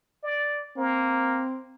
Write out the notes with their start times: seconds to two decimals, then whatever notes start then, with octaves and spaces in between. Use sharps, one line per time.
0.23 D5
0.77 A#3 C4